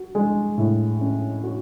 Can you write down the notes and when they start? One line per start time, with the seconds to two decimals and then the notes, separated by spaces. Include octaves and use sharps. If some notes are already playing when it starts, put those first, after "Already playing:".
Already playing: F#4
0.15 G#3
0.58 A2
1.01 C#4
1.44 F#4